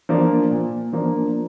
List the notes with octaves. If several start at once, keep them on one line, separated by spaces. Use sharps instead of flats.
F3 A#3 D4
A#2
F3 A#3 D4